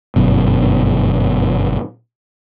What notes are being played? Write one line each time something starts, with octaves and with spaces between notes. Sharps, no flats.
G1 F#2 B2